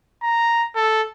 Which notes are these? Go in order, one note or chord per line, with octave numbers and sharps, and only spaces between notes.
A#5
A4